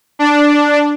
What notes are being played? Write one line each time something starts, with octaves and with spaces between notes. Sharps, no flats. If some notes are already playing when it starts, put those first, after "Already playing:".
D4